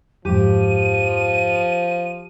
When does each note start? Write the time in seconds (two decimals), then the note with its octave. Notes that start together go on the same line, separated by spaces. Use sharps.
0.25 F2 G#2 F3 G4 D#7